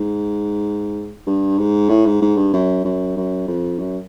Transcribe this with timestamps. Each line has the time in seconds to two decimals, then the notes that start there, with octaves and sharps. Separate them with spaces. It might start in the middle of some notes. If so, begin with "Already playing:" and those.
Already playing: G#2
1.27 G2
1.58 G#2
1.89 A2
2.06 G#2
2.22 G#2
2.37 G2
2.53 F#2
2.85 F#2
3.17 F#2
3.48 F2
3.79 F#2